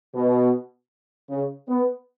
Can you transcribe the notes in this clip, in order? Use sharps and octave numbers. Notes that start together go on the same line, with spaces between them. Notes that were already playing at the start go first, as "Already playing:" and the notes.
B2
C#3
B3